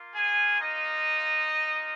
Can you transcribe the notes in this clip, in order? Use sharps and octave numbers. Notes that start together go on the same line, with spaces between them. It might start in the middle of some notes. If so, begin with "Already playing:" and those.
Already playing: A#3 F4
G#4 G#5
D#4 D#5
A#3 F4